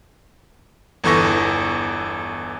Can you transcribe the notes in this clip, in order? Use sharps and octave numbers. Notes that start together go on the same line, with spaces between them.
G1 E2 E3 A4 C#6 A#6